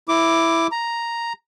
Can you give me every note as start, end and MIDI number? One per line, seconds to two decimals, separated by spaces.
0.08 0.67 64
0.08 0.67 86
0.72 1.33 82